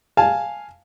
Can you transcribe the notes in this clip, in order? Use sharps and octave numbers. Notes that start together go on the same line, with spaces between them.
F5 G#5 A5